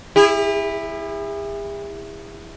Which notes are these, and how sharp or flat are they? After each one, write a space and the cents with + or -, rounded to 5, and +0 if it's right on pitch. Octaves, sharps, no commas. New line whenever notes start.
E4 +0 G#4 -45